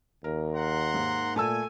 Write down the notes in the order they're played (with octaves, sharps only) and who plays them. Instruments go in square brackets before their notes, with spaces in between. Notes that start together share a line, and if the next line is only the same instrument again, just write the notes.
[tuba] D#2 [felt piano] A#4
[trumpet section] F#5 A#5 C6
[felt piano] G#2 A#3
[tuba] A#2 [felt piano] A3 A5 E6 [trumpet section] G#5